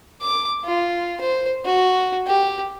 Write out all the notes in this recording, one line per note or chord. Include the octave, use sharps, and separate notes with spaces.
D6
F4
C5
F#4
G4